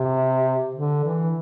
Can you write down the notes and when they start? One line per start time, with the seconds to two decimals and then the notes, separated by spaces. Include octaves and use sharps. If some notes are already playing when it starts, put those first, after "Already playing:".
Already playing: C3
0.75 D3
1.04 E3